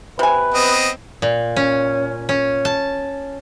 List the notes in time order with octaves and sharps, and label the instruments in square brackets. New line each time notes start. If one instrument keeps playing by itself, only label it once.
[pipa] C3 G#5 [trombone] B4
[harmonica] B3 C4 D#5
[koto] A#2
C#4
C#4
A5